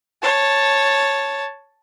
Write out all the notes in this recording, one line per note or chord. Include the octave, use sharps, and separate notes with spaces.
C#5 A5